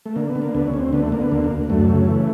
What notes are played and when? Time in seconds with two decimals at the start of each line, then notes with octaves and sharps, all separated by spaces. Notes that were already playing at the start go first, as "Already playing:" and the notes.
0.06 A3
0.16 D3 A#3
0.29 B3
0.35 D3
0.42 A#3
0.55 D2 B3
0.67 C#4
0.74 D2
0.80 C4
0.93 D3 B3
1.02 A3
1.12 D3 A#3
1.22 B3
1.31 D2 A#3
1.44 A#3
1.50 D2
1.70 F#2 A3
1.89 C#3
2.08 E3